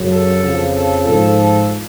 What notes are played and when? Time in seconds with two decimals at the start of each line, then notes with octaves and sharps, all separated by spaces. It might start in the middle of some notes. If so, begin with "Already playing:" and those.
Already playing: F#2 C#3 F#3
0.12 A4
0.44 F2 C#3 F3
0.76 A4
1.07 G#2 F3 A4
1.39 A4